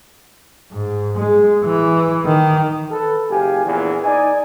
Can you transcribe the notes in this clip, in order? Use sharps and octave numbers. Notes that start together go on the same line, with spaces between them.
G#2
G#3
E3
D#3
A4 B4
F#1 G4 F5 G#5
A#1 E2
D#4 D5 G#5